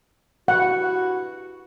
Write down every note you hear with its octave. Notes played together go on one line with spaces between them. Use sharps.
G2 E4 F#4 F#5